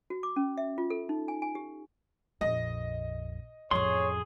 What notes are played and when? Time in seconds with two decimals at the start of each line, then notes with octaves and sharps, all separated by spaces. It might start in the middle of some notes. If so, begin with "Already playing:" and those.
0.10 F#4
0.23 D6
0.36 C#4
0.58 E5
0.78 F4
0.90 A4
1.09 D#4
1.28 G#5
1.42 G#5
1.55 G4
2.41 A#1 F2 D#5
3.71 A1 F2 G#4 C#5 C6